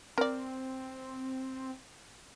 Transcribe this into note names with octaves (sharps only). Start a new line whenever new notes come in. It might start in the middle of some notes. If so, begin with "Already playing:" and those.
C4 A#4 D5